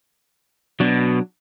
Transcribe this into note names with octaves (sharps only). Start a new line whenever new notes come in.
B2 F#3 D4